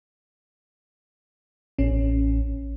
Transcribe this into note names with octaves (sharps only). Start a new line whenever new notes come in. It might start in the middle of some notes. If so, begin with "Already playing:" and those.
A1 C#4